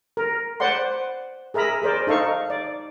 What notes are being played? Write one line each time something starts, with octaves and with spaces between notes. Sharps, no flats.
A#4
B4 C5 D5 F#5 C6
G#4 A#4 E5 A#5 B5
G#4 A#4 C5 D5
D#4 A4 F5 C#6
D5